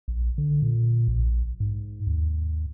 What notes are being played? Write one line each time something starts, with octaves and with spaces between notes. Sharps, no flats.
A#1
D3
A#2
A#1
G#2
D#2